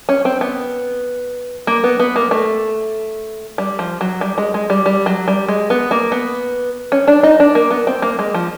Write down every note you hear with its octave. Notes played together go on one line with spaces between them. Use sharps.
C#4
C4
B3
A#3
B3
B3
A#3
A3
G3
F3
F#3
G3
G#3
G#3
G3
G3
F#3
G3
G#3
B3
A#3
B3
C#4
D4
D#4
D4
A#3
B3
C4
A#3
G#3
F3